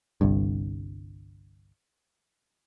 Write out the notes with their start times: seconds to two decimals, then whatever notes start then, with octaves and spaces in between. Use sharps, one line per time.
0.21 G1 C2 G2